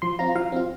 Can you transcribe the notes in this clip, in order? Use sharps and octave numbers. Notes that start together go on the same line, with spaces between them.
F3 C6
C4 F4 A#5
F3 F5
C4 F4